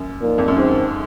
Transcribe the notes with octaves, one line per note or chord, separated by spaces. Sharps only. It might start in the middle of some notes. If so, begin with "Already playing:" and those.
Already playing: F#2
A#2 F3 A#3 D#4 A#4
F2
F#2
G#2 D#3 F#3 C4 F#4 C5